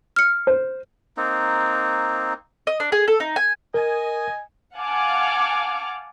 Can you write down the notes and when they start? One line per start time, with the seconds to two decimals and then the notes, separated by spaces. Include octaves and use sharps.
0.16 F6 C#7
0.47 C5
1.17 A#3 C4 D#4
2.67 D#5
2.80 D4
2.92 G#4
3.08 A4
3.20 D#4
3.36 G#5
3.74 A#4 D#5 G#5
4.77 F5 F#5 G#5 A5 D6 F6